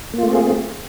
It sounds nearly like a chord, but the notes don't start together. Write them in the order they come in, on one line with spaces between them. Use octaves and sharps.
A#3 F4 A3 C4 G#4